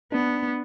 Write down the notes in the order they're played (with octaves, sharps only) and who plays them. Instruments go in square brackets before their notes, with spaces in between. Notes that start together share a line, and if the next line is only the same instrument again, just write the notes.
[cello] B3 [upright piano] D4